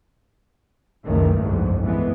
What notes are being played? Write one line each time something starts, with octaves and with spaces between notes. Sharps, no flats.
F#1 C#2 A2 D#3 A3
G1 C2 F2 G#2
A2 E3 G#3 B3